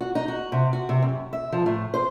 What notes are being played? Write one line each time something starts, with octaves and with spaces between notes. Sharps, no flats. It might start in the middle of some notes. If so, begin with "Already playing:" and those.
F#4
D#4
F#4
C3
F#4
C3
F#2
E5
F3
A2
C5